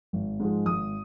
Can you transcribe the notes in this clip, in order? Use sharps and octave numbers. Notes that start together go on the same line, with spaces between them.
G#1
G#2 F3 G#3
G#1 D#6